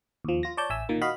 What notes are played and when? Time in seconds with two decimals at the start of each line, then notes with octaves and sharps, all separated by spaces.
0.25 D#2 F3
0.43 F4 A#6
0.57 C#5 D5 A5 G6
0.70 A1 E5 G#5 E6
0.89 A#2 D#3 A#3
1.02 F#4 D#5 F5 B5